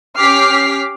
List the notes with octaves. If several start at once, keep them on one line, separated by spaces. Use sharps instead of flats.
C#4 G4 D6 F6 B6 C7